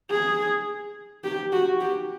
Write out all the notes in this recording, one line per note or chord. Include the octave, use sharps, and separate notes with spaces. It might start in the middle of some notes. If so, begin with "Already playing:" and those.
G#4
G4
F#4
G4